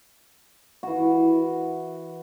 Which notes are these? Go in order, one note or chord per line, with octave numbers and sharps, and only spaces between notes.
E3 F#4